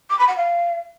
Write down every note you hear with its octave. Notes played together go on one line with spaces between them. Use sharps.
D6
B5
F#5
F5